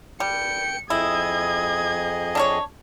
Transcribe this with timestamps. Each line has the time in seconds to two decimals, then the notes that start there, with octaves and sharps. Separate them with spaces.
0.20 G3 G5 C#7
0.90 F2 E4 G#4 D#5 D#6 G#6
2.35 D4 A#4 C#5